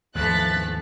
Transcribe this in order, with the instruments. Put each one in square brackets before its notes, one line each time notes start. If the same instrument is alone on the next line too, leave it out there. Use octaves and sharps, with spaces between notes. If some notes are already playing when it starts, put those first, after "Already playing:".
[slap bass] D#2 G#2 E3 [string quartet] F3 A3 [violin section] F#6 A6 B6